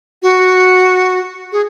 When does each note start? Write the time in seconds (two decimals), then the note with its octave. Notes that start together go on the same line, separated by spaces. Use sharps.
0.23 F#4
1.52 G#4